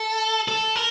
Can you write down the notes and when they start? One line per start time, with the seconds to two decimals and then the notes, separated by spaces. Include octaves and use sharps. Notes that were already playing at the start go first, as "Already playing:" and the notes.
Already playing: A4
0.48 A4
0.75 A#4